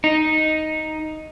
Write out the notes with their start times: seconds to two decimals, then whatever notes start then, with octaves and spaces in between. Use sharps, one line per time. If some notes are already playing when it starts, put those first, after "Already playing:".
0.04 D#4